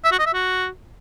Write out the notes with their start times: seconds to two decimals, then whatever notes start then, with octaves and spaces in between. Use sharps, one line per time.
0.04 E5
0.12 F#4
0.19 D#5
0.26 E5
0.33 F#4